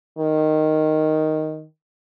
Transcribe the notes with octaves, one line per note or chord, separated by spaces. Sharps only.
D#3